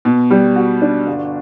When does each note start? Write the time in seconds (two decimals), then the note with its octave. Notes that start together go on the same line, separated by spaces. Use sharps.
0.05 B2
0.31 G3
0.56 F#4
0.82 D4
1.07 G1